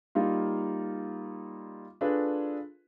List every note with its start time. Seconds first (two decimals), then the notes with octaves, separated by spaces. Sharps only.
0.15 G3 A#3 D#4 F4
2.01 D4 F4 G#4 A4 B4